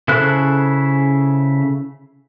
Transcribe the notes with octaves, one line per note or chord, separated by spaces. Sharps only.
C#3 E4 A4 C5 F#6